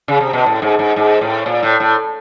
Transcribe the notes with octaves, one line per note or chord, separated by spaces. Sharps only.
C#3
C3
B2
A2
G#2
G#2
G#2
A2
A#2
A2
A2